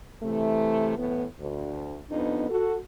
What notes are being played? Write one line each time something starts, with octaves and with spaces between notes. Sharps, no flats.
C3 E3 A3
A2 E3 B3
D2
F2 B3 D4 D#4
F#4 A4